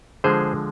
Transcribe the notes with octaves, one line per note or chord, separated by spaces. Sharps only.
D3 F3 G#3 G#4 C5